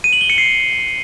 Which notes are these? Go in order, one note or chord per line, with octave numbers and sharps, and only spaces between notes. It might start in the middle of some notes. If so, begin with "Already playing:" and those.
D#7
F#7
G7
C#7
C7